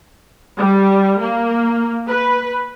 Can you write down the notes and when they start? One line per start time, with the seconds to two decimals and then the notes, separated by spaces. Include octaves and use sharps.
0.58 G3
1.21 A#3
2.08 B4